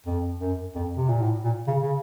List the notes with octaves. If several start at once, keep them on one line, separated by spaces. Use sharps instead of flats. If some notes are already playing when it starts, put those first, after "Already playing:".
F2
F#2
F2
C3
A#2
A2
A#2
C#3
C#3